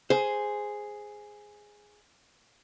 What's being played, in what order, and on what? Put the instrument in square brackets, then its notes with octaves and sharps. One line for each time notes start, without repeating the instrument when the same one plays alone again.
[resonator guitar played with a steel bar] G#4 [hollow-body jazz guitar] C5